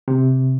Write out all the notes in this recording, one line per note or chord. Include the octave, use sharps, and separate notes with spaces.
C3